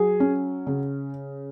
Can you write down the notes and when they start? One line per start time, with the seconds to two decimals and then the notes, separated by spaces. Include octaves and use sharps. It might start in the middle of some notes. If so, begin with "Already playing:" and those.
Already playing: F#3 G#4
0.20 C#4
0.67 C#3